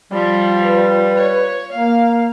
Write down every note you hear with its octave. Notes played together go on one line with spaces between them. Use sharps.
F3 G3
B4
C#5
A#3 F5